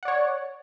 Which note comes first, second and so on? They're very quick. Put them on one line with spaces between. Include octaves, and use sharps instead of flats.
F#5 D5 C#5